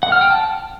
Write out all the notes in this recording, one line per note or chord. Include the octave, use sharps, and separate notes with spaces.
F#5
F6
G5
A5